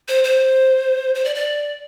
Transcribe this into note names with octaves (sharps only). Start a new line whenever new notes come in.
C5
C5
C5
D5
D5